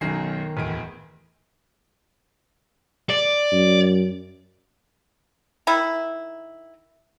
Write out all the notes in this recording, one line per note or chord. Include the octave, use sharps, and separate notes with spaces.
B1 F#2 D#3 D#4 A#4 G#5 C7
D1 E2 B4 D7
D5
F#2
D#3 D#4 E4